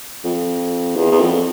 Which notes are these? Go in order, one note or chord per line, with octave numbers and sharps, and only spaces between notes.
F2
E2
E2
F2